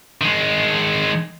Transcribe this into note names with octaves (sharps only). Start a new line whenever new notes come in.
D#3 G#3